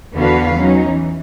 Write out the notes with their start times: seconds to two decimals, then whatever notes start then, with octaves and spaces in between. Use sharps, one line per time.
0.14 E2 D3 B3 F#4 B4 F5
0.57 F#3 C#4 D#4
0.87 E3